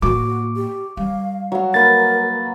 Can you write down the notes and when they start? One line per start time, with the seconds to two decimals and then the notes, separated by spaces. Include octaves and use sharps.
0.02 A2 A#3 F#4 C#6 D6
0.56 G4
0.97 G3 F5
1.52 F#3 F5
1.74 A#3 A#4 B4 A6